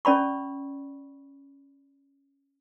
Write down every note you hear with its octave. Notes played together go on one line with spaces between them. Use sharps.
C#4 D5 B5 C#6